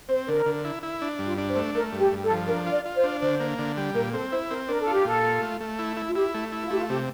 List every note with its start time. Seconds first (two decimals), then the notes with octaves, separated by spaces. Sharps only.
0.09 C4 C5
0.28 D3 A#4
0.46 D3
0.65 E4
0.83 E4
1.02 D4
1.19 G2
1.26 F4
1.38 D4
1.50 C5
1.56 A3
1.75 A3 A#4
1.92 G2
1.98 G4
2.12 G2
2.23 A4
2.30 F3
2.48 D4 A#4
2.67 F4
2.72 D5
2.85 F4
2.96 C5
3.04 D4
3.21 D3 C5
3.40 A#3
3.58 D3
3.77 G3
3.94 A#2 A#4
4.13 C4 A4
4.32 E4 C5
4.50 C4 A#4
4.68 D4 A#4
4.81 A4
4.87 F4
4.93 G4
5.05 A#2 A4
5.23 F4
5.42 A3
5.60 A3
5.79 E4
5.97 E4
6.09 F4
6.15 E4 G4
6.34 A3
6.52 E4
6.64 F4
6.70 A3 G4
6.79 F4
6.89 C3 G4